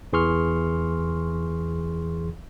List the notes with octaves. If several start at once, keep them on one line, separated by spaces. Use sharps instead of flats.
E2 E3 G#4 C6 C#6 F6